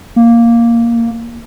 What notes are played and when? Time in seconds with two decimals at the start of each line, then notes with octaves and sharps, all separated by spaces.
0.16 A#3